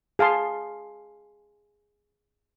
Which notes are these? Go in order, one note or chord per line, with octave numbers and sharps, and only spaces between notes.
G#4 F5 A5 C6